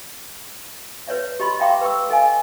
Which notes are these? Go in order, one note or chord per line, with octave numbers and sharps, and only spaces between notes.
B4 C#5 D5 E5
G4 D#5 B5 C6
E5 F5 G5 A#5 C6 D6
B4 G5 C#6 E6
A4 D#5 F5 G#5